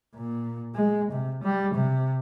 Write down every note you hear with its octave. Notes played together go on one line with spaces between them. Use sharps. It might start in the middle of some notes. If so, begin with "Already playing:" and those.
A#2
G#3
C3
G3
C3